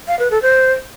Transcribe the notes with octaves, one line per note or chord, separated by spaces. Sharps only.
F5
B4
A4
C5